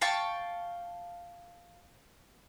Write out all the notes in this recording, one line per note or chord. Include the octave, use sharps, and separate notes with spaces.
F5 G5 A5 C#6